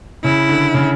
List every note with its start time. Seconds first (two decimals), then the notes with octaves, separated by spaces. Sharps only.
0.24 C#3 E4
0.49 D3
0.74 C#3